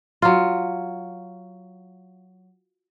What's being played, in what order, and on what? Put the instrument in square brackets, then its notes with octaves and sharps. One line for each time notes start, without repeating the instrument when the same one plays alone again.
[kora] F#3 F4